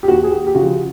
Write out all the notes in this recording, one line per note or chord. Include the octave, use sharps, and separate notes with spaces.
G4
D#2 F#4
G#4
G4
G4
C#3 F3 F#4